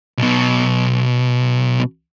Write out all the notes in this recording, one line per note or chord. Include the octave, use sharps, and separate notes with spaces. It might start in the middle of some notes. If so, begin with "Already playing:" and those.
B1 B2